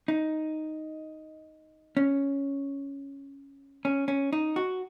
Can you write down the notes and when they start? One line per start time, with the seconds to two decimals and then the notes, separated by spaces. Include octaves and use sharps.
0.08 D#4
1.97 C#4
3.85 C#4
4.08 C#4
4.33 D#4
4.56 F#4